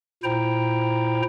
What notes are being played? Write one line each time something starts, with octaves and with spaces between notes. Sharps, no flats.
A#2 E4 C5 G5 A#5